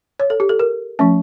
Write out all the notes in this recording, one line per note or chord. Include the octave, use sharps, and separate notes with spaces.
C#5
A4
G4
A4
A#4
F3 A3 C#4